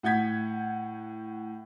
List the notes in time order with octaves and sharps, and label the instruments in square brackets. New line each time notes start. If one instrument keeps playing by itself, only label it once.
[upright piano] A2 F#5 G6 G#6 B6